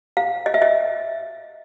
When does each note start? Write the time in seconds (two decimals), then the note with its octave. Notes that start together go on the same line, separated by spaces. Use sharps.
0.17 F5
0.46 D#5
0.54 E5
0.62 D#5